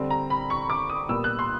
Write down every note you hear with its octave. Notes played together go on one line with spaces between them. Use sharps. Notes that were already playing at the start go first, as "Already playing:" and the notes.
Already playing: D3 G3 C4
A#5
B5
C#6
D6
D#6
A#2 G3 B3 E6
F#6
C6